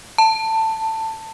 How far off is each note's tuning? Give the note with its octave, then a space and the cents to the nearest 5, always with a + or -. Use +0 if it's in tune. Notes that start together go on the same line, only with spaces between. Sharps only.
A5 +10